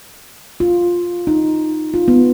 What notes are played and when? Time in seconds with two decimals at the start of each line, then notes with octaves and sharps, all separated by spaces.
0.60 F4
1.27 D#4
1.94 F4
2.08 B3